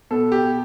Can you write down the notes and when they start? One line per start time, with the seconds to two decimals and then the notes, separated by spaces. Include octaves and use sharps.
0.11 B2 B3 A4
0.32 G4